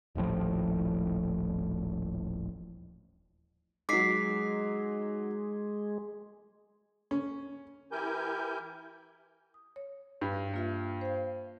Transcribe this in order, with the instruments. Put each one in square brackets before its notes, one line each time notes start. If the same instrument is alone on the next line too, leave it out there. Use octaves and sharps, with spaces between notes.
[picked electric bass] D#1 A1 A2 F3
[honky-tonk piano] F#3 D#4 [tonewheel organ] G#3 [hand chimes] D6 B6 C7
[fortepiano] C#4
[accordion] E3 E4 G4 A#4 G#5 G6
[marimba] D#6
C#5
[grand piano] G2 [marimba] B4
[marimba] A#3 F4 E5
C5 F5